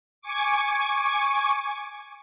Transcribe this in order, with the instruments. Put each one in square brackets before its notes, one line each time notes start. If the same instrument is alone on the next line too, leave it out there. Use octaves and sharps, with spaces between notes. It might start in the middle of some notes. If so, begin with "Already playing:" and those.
[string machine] G#5 C#6 D6